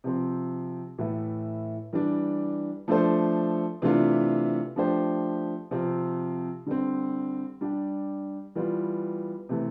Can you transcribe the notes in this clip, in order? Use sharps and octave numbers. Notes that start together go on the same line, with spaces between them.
C3 F3 C4
A2 E3 A3 E4
E3 G3 D4
F3 A3 D4 A4 C5
C3 E3 A3 D4 F4
F3 A3 D4 G4 C5
C3 F3 C4 F4
D3 G3 C4
G3 D4 G4
E3 G3 B3 F4
C3 E3 A3